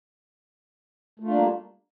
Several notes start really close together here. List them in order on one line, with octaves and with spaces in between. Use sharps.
A3 F4 D4 A#3 G3